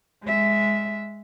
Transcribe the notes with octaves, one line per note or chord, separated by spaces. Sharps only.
G#3 E5